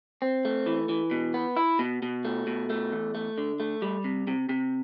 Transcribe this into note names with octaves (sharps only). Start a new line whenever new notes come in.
C4
A3
E3
E3
B2
B3
E4
B2
B2
A3
B2
A3
E2
A3
D3
A3
G3
C3
C3
C3